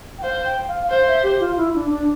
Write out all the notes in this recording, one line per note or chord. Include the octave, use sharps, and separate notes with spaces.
G5
C5 F5
G5
F5
C5 F5
E5
G4
F4
E4
D4
D4